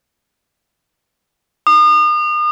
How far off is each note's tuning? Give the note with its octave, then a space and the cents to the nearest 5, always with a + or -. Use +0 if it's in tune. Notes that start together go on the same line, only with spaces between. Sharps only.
D#6 -40